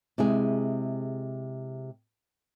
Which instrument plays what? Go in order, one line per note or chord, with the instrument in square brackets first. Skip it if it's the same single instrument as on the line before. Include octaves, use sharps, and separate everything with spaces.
[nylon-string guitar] C3 G#3 E4 G#4